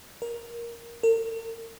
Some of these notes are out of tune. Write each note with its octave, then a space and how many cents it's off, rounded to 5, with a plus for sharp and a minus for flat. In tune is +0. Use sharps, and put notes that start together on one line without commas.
A#4 +10
A#4 -45